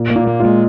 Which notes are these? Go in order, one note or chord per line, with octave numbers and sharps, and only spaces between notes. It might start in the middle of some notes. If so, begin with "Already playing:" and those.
Already playing: A#2
A#3
A#2
A#3
F4
G#3